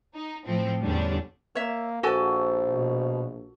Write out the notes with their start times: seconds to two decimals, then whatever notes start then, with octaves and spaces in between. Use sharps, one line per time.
0.15 D#4
0.46 A2 F3 C4
0.82 E2 D3 G3 C#4 D4
1.55 A#3 C#5 E5
2.03 A#1 F#4 A4 C5 G#5
2.65 B2